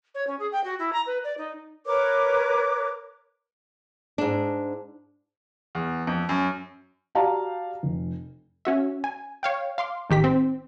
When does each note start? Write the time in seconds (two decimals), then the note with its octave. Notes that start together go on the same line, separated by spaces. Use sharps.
0.15 C#5
0.27 C#4
0.39 G#4
0.52 G5
0.64 F#4
0.79 E4
0.93 A#5
1.06 B4
1.24 D5
1.38 D#4
1.85 A#4 B4 C#5 D6
4.18 G#2 D4
5.75 E2
6.07 F2
6.29 F#2
7.15 F#4 G4 D5 F5 A5 A#5
7.83 F1
8.65 C#4 F#4 E5
9.04 G#5
9.43 C#5 F5 G5
9.78 F5 C6 D6
10.10 A1 D#3 G4 B6
10.24 C4